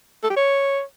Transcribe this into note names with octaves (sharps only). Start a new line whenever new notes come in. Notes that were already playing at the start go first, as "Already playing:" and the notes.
A4
G4
C#5